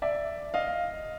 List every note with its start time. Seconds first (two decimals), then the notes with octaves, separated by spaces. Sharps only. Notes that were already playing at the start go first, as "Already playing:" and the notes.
0.02 D5 E5
0.54 D#5 F5